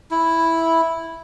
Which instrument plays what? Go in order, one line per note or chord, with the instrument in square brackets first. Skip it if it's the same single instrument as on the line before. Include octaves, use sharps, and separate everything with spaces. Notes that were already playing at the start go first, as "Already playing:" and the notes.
[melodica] E4